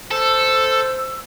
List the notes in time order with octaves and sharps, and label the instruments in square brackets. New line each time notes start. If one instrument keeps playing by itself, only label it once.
[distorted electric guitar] A4 [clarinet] C5 [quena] E6